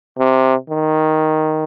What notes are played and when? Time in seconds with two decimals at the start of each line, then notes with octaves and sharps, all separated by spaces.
0.18 C3
0.70 D#3